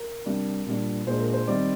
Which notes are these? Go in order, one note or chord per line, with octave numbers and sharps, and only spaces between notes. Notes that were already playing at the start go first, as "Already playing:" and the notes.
Already playing: A#4
C3 G3 D4
A#2 G3 D4
A#2 G#3 D4 C5
A#4
C5
D#3 G3 C4 D5